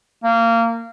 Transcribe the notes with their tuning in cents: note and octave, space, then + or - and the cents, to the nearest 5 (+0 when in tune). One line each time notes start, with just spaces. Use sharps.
A#3 -20